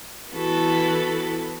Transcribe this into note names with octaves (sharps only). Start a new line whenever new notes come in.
E3 B3 E4 F#4 A4 B4